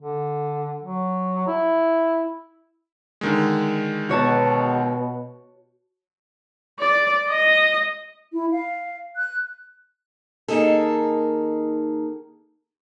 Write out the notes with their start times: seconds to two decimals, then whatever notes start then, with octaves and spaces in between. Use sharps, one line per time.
0.01 D3
0.83 F#3
1.47 E4
3.21 D3 D#3 G#3
4.09 B2 F#4 C#5 A5
6.79 D5
7.29 D#5
8.33 E4
8.52 F5
9.17 F#6
10.48 D#3 A#3 D#4 G#4 A4